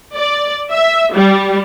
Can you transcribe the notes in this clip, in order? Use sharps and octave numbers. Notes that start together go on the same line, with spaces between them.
D5
E5
G3